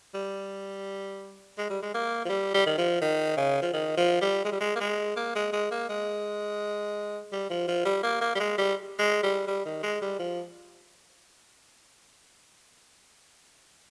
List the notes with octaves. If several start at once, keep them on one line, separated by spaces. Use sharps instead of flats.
G3
G#3
G3
G#3
A#3
F3
G3
G3
D#3
F3
D#3
C#3
F3
D#3
F3
G3
G#3
G3
G#3
A#3
G#3
A#3
G#3
G#3
A#3
G#3
G3
F3
F3
G3
A#3
A#3
G3
G#3
G3
G#3
G3
G3
D#3
G#3
G3
F3